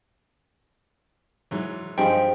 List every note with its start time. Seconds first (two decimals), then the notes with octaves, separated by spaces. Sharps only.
1.51 G#2 E3 F#3
1.98 G2 F3 G3 G#3 G5